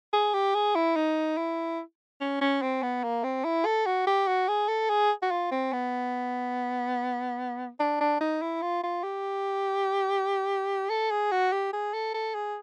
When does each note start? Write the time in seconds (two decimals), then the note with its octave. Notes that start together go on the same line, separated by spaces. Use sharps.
0.13 G#4
0.34 G4
0.55 G#4
0.75 E4
0.96 D#4
1.37 E4
2.21 C#4
2.41 C#4
2.62 C4
2.83 B3
3.04 A#3
3.24 C4
3.45 E4
3.65 A4
3.86 F#4
4.07 G4
4.27 F#4
4.49 G#4
4.68 A4
4.90 G#4
5.22 F#4
5.31 F4
5.51 C4
5.73 B3
7.80 D4
8.01 D4
8.21 D#4
8.42 E4
8.62 F4
8.83 F4
9.04 G4
10.90 A4
11.11 G#4
11.32 F#4
11.52 G4
11.73 G#4
11.94 A4
12.14 A4
12.35 G#4